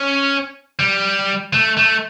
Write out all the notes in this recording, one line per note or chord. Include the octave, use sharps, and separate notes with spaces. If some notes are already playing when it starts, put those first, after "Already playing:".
Already playing: C#4
G3
A3
A3